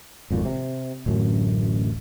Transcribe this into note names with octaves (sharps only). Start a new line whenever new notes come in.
G#1 F2 A#2
C3
D1 A1 F#2